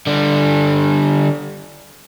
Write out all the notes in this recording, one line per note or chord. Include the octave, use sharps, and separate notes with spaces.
D3 G3